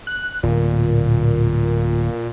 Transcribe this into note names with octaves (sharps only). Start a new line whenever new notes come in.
F#6
D1 A#2